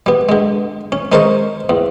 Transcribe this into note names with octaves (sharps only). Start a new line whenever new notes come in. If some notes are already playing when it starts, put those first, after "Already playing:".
G3 B3
D3 G#3
C#4
G#3 C#4 A#4 C5 D#5 C#6
E2